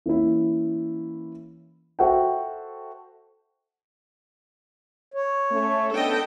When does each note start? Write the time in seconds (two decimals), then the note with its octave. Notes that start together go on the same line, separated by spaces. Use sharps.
0.06 E3 A#3 C#4 E4
1.99 F#4 A4 C5 E5 F#5 G5
5.14 C#5
5.51 A3 C#4
5.94 B3 C#4 D4 A4 D#5 G5